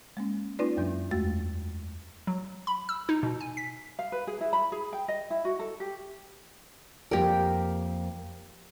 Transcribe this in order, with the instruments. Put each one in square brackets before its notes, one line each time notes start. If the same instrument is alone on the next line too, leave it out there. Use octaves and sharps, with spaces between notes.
[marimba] G#3 A#3 C#4
A#3 C#4 D#4 F4 B4 D5
F#2 F#3 D4
E2 G#3 A3 F#4 A6
[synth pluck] F#3
B5
E6
D#4
B2
G#5
B6
[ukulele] F5
B4
G#4
E4
B5
G#4
G5
D#5
E4
F#4
A4
G4
[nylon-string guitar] F2 A#3 D5 [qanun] G4 A#4